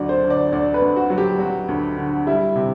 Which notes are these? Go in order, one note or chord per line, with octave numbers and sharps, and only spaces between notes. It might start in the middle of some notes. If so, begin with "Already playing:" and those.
Already playing: D2 F#3 D5
C5
D3
D5
D2 D5
B4
D2
F#4
F#3
G4
F#3 F#4
D2
D3
G3 E4
C3